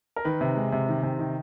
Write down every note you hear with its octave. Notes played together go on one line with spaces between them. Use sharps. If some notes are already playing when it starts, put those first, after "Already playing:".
A#4
D#3 B4
C3
G#3
C3
D#3
C3
D#3